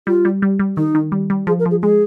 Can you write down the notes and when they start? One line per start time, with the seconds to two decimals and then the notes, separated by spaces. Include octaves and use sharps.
0.07 G3 F4
0.25 G3
0.42 G3
0.59 G3
0.77 D#3 D#4
0.95 D#3
1.12 G3
1.30 G3
1.47 F3 G#4
1.59 A#4
1.66 F3
1.71 G#4
1.82 G#3 G#4